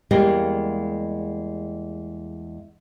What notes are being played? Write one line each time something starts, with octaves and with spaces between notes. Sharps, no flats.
E2 G3 G#3 A#3 D#5 F5